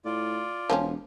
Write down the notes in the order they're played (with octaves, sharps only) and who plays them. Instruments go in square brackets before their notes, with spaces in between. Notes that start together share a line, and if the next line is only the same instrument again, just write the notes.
[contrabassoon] A2 [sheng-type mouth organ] F4 D5
[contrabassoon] E1 [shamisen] F3 C4 C#4